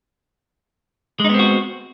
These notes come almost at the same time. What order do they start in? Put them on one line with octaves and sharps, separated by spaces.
G#3 D#4 B3 C4 F#4